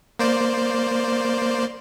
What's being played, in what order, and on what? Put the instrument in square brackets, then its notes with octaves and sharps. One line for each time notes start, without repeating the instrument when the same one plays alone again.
[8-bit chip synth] A#3 C5 D5